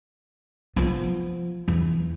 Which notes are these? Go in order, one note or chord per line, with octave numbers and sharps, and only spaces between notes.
F3 B3
E2